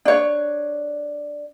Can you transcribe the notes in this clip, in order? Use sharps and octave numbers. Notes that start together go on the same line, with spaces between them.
D4 C#5